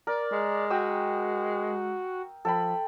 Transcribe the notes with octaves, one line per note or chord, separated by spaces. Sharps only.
A#4 D5
G#3
F#4 G5 D#6 E6
F3 A4 G5 B5